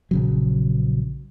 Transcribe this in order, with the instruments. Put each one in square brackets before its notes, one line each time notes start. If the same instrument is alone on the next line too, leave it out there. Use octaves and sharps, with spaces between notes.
[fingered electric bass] A#1 C#3 F#3